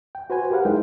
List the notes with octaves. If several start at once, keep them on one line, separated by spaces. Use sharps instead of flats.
G5
F#4 B4 C5 G#5
G4 A#4 B4 F5 F#5
G#3 D#4 E4 C5 G5